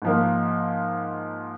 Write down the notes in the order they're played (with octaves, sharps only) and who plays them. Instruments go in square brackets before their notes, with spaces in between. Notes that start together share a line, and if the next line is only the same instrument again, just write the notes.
[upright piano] G#2 F3 A#3